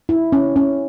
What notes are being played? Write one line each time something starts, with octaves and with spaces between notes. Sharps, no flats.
E4
C#4
C#4